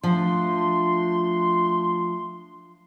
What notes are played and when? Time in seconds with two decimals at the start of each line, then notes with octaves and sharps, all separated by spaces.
0.03 F3 A3 D4 C6